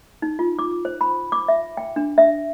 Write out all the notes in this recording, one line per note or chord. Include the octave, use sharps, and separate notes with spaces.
D#4
F4
D6
C5
B5
D6
E5
G5
D4
E5